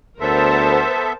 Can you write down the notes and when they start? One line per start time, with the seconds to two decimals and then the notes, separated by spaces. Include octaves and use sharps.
0.21 D2 B3 A4 A#4 C5 E5 A5